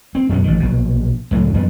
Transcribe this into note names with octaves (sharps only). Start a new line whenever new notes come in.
C4
F#2 B2 A#3 C#4
A1 D#3
A#1 B2
C#2 A2 D3 F#3
F#2 F3 B3